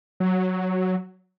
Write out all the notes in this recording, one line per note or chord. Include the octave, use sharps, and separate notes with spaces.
F#3